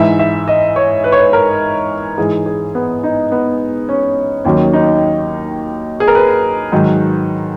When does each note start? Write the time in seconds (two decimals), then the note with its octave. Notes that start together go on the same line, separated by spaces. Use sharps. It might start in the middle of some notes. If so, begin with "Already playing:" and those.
Already playing: G#2 E3 E5
0.19 E5
0.48 D#5
0.76 C#5
1.04 B4
1.12 C#5
1.19 B4
1.33 A#4
2.18 G#2 E3 G#4
2.46 G#4
2.75 B3
3.04 D#4
3.32 B3
3.89 C#4
4.45 D#2 D#3 F#3 C#4
4.73 D#4
6.00 G#4
6.08 A#4
6.15 B4
6.72 G#2 D#3 F#3